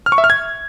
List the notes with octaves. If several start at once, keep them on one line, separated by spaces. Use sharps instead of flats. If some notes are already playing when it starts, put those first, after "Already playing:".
F6
C#6
E5
F6
G#6